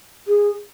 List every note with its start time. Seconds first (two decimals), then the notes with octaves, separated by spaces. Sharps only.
0.27 G#4